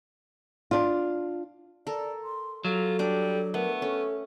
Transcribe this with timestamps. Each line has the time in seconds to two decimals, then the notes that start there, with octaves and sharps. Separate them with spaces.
0.71 D4 F4
1.87 A4 A#4 D5
2.24 C6
2.64 F#3 F4 A4
2.99 G3 D4 D6
3.54 A3 B3 A#4
3.82 C#4 A4